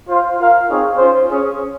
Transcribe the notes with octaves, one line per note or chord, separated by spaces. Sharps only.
F4 C5 F5
F4 A#4 F5
C4 D#4 G#4 C#5 F5
C#4 F4 C5
C#4 G#4 C#5